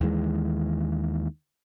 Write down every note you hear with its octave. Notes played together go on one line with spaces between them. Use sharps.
D#2 D#3 E3 G#3